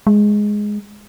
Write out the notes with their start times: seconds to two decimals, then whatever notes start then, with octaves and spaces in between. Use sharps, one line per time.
0.07 G#3